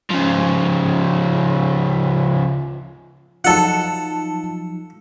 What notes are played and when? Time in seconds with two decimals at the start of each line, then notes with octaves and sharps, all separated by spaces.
0.11 C#3 F3
3.44 F3 F#3 D#4 F4 A4 F#5 A5